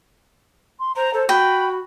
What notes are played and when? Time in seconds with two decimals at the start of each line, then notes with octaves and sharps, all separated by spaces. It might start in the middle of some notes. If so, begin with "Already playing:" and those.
0.80 C6
0.96 C5 A#5
1.14 A4 C5
1.29 F#4 G5 B5